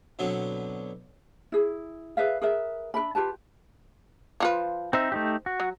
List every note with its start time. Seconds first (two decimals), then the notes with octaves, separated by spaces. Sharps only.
0.19 B2 D3 F#3 B3 C4
1.52 E4 G#4
2.17 G#4 B4 E5 F5
2.42 G#4 A#4 B4 E5
2.94 D4 A#4 E5 B5
3.15 F4 G4 B4 A5
4.40 F3 F4 B4
4.93 C4 D#4 C5 E5
5.12 A3 D#4 G4
5.46 F#4
5.60 F#3